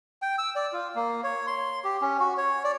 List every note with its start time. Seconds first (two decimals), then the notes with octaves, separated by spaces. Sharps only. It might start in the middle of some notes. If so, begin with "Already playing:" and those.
0.22 G5
0.38 E6
0.56 D5
0.73 F4
0.95 A#3
1.24 C#5
1.47 C6
1.84 G4
2.02 C#4
2.20 F#4
2.37 C#5
2.64 D5